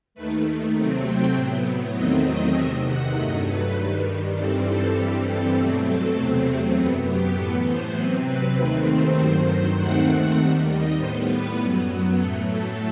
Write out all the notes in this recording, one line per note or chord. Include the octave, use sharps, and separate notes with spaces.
D#2 D#3 A3 B4
C3 F#3 A3 C4
G5
A2 F#3 B3
E2 D#3 F#3 A3 C4 D#5
D#5
E2 C3 D#3 E5
F#5
G2 F#3 A3 D#5
B4
G2 D#3 G3
G2 E3 G3 C4 A4
A4
G2 E3 G3 C4 G4
A4
B2 F#3 A3 C4
A4
E2 C3 F#3 A3 C4
F#2 F#3 B3 B4
G4
A2 E3 B3 A4
C5
C3 F#3 C4 B4
B4
D#2 D#3 A3 C4 B4
C5
G2 D#3 F#3 C5
D#2 D#3 A3 C4 F#5
D#2 D#3 G3
D#5
A2 G3 B3 C5
B4
F#2 F#3 B3
A2 F#3 A3 A4
A4